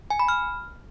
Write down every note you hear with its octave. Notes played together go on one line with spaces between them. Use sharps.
G#5
B5
F6